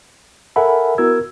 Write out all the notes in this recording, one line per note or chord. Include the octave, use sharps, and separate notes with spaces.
A4 A#4 E5 F#5 G#5 B5
B3 E4 F#4 A#4 E6 G#6